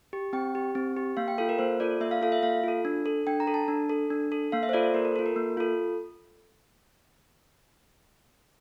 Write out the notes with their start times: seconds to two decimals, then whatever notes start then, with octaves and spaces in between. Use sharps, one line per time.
0.13 G4
0.33 C4 G5
0.55 G4
0.75 C4
0.97 G4
1.17 A#3 F5
1.28 G5
1.38 F4 A4 F5
1.49 A#4
1.59 A#3 C5
1.80 F4 A4 D5
2.01 A#3 E5
2.11 F5
2.22 F4 A4 F5
2.32 E5
2.43 A#3 F5
2.64 F4 A4
2.85 D4
3.06 A4
3.27 D4 G5
3.40 A#5
3.47 A4
3.54 A5
3.68 D4
3.89 A4
4.10 D4
4.32 A4
4.52 A#3 F5
4.63 E5
4.69 C5
4.73 F4 A4 D5
4.83 C5
4.94 A#3 A#4
5.05 A4
5.16 A4
5.19 F4
5.26 A#4
5.36 A#3
5.57 F4 A4